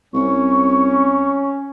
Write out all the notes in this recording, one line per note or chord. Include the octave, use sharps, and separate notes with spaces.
C2 C#4 C#6